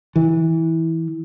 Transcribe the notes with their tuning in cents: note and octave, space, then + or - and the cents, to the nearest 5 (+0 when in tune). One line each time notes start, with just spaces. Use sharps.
E3 -20